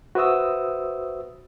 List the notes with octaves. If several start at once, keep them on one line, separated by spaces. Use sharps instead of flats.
F#4 B4 C5 E5 D#6 E6